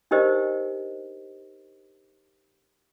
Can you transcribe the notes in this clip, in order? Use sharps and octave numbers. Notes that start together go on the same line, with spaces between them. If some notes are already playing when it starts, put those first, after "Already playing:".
D4 D#4 G4 A#4 C5 D#5